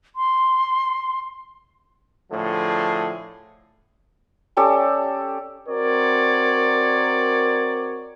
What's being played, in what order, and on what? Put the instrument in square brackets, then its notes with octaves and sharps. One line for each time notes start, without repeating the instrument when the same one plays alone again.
[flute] C6
[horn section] A2 D3 F3 A3 G#4
[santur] C#4 G4 A4 D5
[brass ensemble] C4 F#4 A#4 C#5 D5